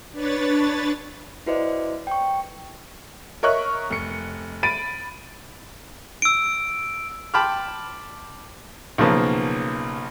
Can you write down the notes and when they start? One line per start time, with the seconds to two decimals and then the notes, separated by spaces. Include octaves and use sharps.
0.12 D4 B4 C#5 A6
1.46 E4 F#4 B4 C5 D5 D#5
2.07 G5 C#6
3.43 A#4 C#5 D#5 E5 C#6 F#6
3.90 F1 C#7
4.63 B5 A6 D7 D#7
6.22 E6 D7
7.34 G5 A5 B5 C6 D6 F6
8.98 B1 C#3 F3 A#3 B3 A5